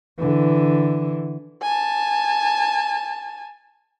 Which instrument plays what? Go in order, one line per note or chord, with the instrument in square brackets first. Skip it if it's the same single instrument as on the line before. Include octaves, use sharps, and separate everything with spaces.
[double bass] D3 E3
[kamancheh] G#5 A5